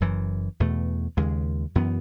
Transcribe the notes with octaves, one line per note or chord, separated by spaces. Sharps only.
F#1 F#2 E3
E2 B2 A3
D#2 C#3 G#3
F#2 E3 B3